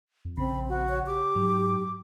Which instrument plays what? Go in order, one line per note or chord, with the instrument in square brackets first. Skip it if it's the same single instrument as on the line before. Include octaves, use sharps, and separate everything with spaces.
[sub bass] F2
[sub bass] A#1 [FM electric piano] C#3 [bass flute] C4 [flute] B5
[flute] F#4
[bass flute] C#5
[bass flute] G4 [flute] D6
[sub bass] G#2 [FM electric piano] F#3